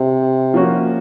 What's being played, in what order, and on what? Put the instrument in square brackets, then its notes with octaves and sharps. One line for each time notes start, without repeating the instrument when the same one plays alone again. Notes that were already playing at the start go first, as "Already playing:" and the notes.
Already playing: [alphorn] C3
[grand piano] F3 A#3 C#4 F#4